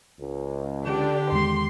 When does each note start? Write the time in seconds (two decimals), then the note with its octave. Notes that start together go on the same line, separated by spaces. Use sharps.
0.19 C#2
0.85 D3 D4 G4
1.32 E2 D#3 G#3 C6